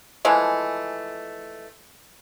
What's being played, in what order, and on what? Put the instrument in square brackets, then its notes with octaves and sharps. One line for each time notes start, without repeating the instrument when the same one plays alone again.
[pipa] E3 F3 G#3 A3